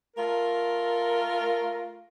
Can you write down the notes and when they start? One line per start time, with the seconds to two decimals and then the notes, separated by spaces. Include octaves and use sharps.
0.17 A3 F4 A#4